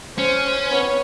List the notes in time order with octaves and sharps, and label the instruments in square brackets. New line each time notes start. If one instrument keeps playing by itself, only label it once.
[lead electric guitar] C#4 [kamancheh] C5
[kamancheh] B3 C#5